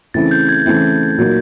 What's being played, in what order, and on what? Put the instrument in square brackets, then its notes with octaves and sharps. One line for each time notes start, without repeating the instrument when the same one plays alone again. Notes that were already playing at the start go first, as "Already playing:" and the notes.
[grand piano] C#3 E3 A3 C4 E4 [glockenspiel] A6
[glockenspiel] G6
G#6
[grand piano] C#3 E3 A3 C4 E4
A#2 F#3 A#3 D#4